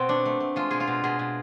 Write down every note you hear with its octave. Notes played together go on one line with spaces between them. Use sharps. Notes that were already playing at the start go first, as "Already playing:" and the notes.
Already playing: B2 C4
A3 D4
A3
A3
G#3 F4
B2 G#4
F4
B2
B2 G#4
B2